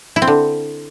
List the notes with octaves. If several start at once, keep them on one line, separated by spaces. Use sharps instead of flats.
E4
C4
D3